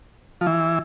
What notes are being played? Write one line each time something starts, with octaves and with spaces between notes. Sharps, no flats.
F3
E3